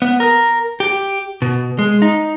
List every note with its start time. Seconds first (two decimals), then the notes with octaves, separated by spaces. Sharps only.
0.02 B3
0.20 A#4
0.80 G4
1.42 B2
1.79 G#3
2.02 D#4